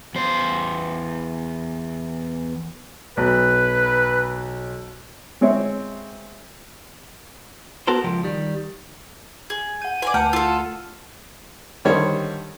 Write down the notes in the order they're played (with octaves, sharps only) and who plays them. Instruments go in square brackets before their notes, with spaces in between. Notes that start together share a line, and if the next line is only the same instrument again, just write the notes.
[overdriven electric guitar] E2 C5
[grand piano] B1 [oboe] B4
[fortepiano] G#3 C4 C#5 E5
[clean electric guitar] B3 F#4 A4 A#4 C5
C#2 F3 G4
D#3 G3
[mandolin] G#4
[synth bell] F#5 G6 [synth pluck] D#7
[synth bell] B4 [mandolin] D5 F5 G#5
[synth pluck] D2 F#5 F6 [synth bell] A3 A5 C#7 [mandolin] G5
[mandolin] F4 A4 [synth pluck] E6
[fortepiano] D3 D#3 G3 C5 C#5